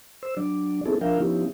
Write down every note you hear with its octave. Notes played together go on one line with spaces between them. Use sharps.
C5 E6
F#3 D4 D5
B3 C4 D#4 E4 G#4 A4
F3 D4 A#4 E5 F5 G5
F3 B3 C#4 D#4 E4 G4